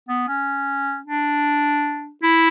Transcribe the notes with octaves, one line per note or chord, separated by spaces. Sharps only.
B3
C#4
D4
E4